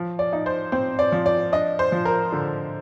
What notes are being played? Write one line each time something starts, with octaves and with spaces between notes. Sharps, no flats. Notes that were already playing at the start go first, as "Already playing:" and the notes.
Already playing: F3
D5
D#4
C5
C4 C5
D5
F3
D5
D4 D#5
C5
F3
A#4
D3